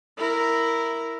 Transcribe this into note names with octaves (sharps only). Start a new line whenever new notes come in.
E4 A#4